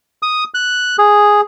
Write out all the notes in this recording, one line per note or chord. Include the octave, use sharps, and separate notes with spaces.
D#6
F#6
G#4